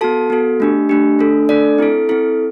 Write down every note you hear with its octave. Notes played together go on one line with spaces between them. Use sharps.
B3 F#4 A4 A5
B3 F#4 A4
A3 D4 G4
A3 D4 G4
A3 D4 A4
A3 D4 A4 D5
C4 E4 A4
C4 E4 A4